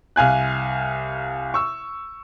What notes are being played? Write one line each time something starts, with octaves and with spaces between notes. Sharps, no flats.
C2 F5 G#5 F#6
C#6 E6